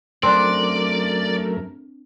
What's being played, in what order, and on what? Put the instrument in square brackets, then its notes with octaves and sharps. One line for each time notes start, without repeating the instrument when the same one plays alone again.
[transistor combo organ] F#2 A3 A#4 [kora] C4 D4 [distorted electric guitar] D5